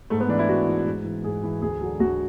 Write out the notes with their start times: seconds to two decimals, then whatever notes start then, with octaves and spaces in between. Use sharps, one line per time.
0.10 G#2 A3
0.20 B3
0.29 E3 D4
0.39 E4
0.48 G#2 F#4
0.67 E3
0.86 G#2
1.05 E3
1.23 G#2 G#4
1.43 E3
1.62 D2 G#4
1.81 D3 F#3
2.00 D2 F#4